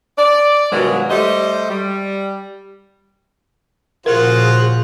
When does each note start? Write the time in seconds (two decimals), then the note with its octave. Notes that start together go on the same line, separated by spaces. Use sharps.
0.18 D5
0.72 G2 B2 D#3 F3 F#3 G#3
1.10 G3 A3 C5 D#5
1.70 G3
4.06 A#2 C#3 F3 F4 F#4 G#4 A#4 C5